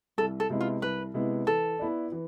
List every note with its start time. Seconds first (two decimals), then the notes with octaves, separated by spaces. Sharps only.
0.18 C2 A4
0.40 A4
0.50 C3 G#3 B3 E4
0.60 F4
0.82 C2 B4
1.14 C3 G#3 B3 E4
1.47 E3 A4
1.79 B3 E4 B4 D5
2.12 E3